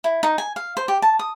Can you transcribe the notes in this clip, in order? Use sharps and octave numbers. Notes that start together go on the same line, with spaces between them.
E4
D#4
G#5
F5
C5
G4
A5
D#6